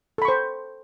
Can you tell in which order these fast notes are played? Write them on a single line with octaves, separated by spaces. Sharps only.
A4 B5 C#6 C5